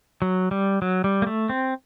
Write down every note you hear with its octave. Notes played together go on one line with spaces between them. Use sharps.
F#3
G3
F#3
G3
A#3
A3
C4